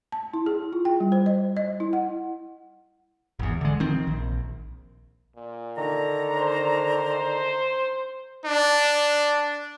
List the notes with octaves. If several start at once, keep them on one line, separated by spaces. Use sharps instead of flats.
A5
E4
G#4
F4
G5
G3
C5
D#5
D#5
E4
F#5
G#1 E2
D3 G#3
D#3 F3 C4
A#1
A#2
D3 D#3 A#5
C5
D4